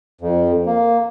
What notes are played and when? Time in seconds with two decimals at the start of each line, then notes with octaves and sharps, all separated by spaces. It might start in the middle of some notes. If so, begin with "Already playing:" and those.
0.21 F2
0.66 A#3